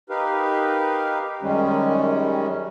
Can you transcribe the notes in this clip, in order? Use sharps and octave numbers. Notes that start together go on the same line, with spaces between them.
D#4 G4 A#4 B4 F5
F#2 D#3 G3 G#3 C#4